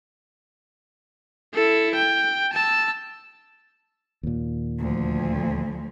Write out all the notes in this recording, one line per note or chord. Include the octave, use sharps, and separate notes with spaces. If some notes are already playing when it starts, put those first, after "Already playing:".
E4 A4
G5
A5 E6
D#2 A#2
D2 F3